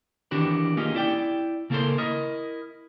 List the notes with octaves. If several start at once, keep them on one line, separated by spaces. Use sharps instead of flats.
D#3 E3 D4 F#4 G4 B4
A#3 C#4 D#4 F4 G4 G#4
E4 D5 G5
C#3 A#3 A4 A#4 C5 C6
E4 A#4 D#5